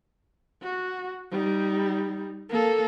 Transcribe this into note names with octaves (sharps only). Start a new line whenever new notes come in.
F#4
G3 D#4
A#3 A4